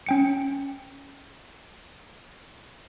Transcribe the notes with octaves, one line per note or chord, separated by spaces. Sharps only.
C#4 G5 C#7